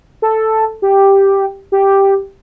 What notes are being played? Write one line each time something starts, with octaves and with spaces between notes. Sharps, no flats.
A4
G4
G4